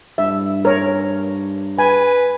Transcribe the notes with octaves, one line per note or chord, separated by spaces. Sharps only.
G2 E5
A#4 C#5
B4 G#5